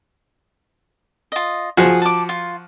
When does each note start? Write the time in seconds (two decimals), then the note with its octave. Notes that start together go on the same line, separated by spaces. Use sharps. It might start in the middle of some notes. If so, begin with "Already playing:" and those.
1.32 F4 D#5
1.77 F3 F#4 G#4
2.02 A5 D6
2.29 F4